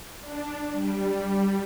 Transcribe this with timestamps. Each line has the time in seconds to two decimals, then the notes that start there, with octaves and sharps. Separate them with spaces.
0.20 D4
0.72 G3